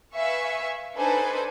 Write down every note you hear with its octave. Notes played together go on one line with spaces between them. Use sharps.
B4 E5 F5 G#5 C#6
D4 D#4 A4 B4 C5 G#5